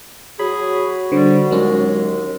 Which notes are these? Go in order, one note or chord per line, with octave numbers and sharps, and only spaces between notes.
F#3 F#4 G#4 B5
D3 G3 C5
D#2 F#3 G#3 C#4